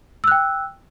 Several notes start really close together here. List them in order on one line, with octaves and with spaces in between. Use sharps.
E6 F#6 G5